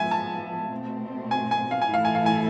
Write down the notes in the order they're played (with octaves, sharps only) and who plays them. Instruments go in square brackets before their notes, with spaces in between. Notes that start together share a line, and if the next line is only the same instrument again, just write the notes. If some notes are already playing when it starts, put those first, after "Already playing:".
Already playing: [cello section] F3 G#3 B3 [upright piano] E5 G#5
[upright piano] A5
[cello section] B2 A3 C4
[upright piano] G#5
G#5
F5
G#5
[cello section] A2 E3 A3 E4 A4 [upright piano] F5
[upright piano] G#5
F5
G#5